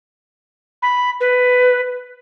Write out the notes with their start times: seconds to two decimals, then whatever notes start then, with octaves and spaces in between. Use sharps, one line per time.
0.82 B5
1.20 B4